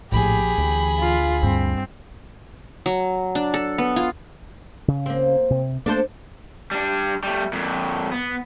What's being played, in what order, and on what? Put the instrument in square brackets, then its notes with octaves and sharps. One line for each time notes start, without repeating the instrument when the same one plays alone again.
[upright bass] A#1 F3 [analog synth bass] A2 [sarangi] G4 [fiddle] G#4 B5
[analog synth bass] D2 [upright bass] E3
[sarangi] F4
[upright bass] G2 [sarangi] C4
[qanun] F#3
D4
A4
B3
F4
[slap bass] C#3
[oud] A#3 C4
[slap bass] C3
[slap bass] A3 A#3 [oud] D4 A4 C5
[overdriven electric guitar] G3 D4
G3 A3
F2 A#2
B3